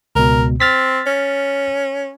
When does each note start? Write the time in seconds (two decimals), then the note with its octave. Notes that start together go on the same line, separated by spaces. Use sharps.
0.15 C#2 B2 A#4
0.60 C4 F6 A6 B6
1.07 C#4